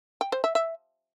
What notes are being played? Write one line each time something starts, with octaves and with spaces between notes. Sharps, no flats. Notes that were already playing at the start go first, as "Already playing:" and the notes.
G5
C5
E5
E5